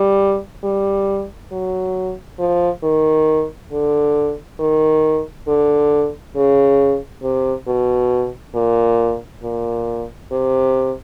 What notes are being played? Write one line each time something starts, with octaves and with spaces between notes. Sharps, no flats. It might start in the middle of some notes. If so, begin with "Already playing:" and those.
Already playing: G3
G3
F#3
F3
D#3
D3
D#3
D3
C#3
C3
B2
A#2
A#2
C3